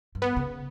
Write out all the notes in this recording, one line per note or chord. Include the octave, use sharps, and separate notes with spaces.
G2
B3
C#3